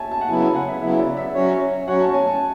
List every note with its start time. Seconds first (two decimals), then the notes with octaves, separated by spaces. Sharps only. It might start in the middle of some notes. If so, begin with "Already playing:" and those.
Already playing: C#5 E5 G#5 A5
0.11 A5
0.21 F#5
0.29 C#3 F#3 B3 E4 G#5
0.41 G#5
0.55 F#5
0.68 E5
0.82 C#3 F#3 B3 E4 E5
0.99 D5
1.17 E5
1.34 F#3 C#4 F#4 C#5 E5
1.87 F#3 C#4 F#4 C#5 F#5
2.01 A5
2.14 G#5
2.27 A5